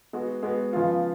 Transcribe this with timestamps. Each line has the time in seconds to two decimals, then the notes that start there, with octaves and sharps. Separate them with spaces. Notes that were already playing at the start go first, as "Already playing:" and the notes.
0.13 G#3 B3 F#4
0.43 G#3 B3 F#4
0.73 C#3 F3 B3 F4